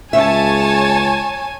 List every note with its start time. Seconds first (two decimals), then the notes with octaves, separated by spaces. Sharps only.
0.13 C#2 C#5 E5 G#5 A5